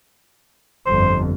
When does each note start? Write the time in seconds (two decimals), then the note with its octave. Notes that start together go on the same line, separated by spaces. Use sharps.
0.86 G1 F2 C5